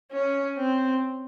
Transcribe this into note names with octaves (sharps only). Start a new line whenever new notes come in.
C#4
C4